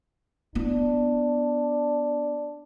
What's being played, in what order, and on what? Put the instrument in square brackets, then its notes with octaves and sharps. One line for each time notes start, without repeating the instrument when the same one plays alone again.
[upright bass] B3 E4 [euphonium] D4